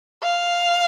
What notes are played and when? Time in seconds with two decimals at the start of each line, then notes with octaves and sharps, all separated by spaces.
0.23 F5